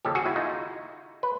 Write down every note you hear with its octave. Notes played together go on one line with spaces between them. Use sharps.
D#2 C#3 F3 G4 A4
F#4 G#4
E4 F#4
D#4 F4
B4